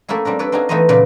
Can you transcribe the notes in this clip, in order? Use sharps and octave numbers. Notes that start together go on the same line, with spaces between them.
A3 A#3 C#4 E4 G#4
G3 C4 D4 A#4
D4 A4 B4 C#5 D5
C4 D4 D#4 F4 F#4 G#4
E3 A3 B3 D#4 C5 D#5
A#2 C#3 F#3 B4 D5